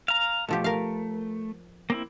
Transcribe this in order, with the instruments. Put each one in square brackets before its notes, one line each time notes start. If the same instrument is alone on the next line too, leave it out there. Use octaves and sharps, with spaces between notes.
[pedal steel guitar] F5 A#5
[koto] B2 F3 G4 [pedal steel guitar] A3
[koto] A#4 F5
[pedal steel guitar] A#3 C4 E4